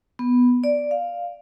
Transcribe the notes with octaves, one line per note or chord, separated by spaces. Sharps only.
B3
D5
F5